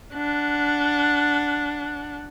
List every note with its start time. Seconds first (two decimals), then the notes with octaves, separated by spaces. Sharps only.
0.13 D4 F#5